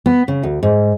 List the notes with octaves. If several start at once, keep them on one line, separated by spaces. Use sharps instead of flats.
B3
C#3
D2
G#2